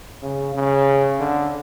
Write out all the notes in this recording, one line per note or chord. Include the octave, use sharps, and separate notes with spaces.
C#3
C#3
D3